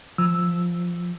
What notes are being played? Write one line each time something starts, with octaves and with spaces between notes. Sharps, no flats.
F3 E6